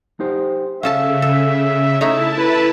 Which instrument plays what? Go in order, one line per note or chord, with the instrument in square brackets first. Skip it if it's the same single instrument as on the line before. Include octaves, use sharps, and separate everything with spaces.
[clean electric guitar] D#4 G4 C5
[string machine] C#3 [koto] C#4 A4 A5 [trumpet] E5 [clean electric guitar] F5
[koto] A4
[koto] A3 D#4 C#5 [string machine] E4 A5 [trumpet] E5
[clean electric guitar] A4 [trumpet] B4